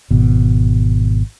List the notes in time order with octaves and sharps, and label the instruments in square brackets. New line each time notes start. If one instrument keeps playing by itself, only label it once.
[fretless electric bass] G#1 B2